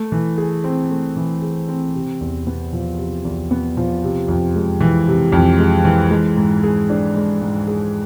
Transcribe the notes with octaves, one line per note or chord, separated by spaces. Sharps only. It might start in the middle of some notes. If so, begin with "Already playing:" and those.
Already playing: A3
E3
G#4
C4
A3
E3
G#4
C4
C3
E2
B3
F3
C3
E2
B3
F3
C3
F2
G#3
E3
C3
F2
G#3
E3
G#3
G#2
G#4
D4
G#3
G#2
G#4